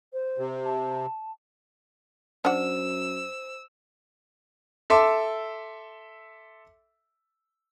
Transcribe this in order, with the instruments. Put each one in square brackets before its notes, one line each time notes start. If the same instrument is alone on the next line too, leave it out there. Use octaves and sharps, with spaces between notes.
[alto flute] C5
[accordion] C3
[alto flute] A5
[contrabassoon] F#2 [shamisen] D4 F#4 [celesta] C5 [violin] E6
[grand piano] A4 E5 C6 D6